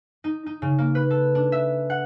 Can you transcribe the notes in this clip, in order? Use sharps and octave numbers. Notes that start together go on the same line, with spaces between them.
D#4
D#4
C#3
A#3
B4
A4
D4
E5
F#5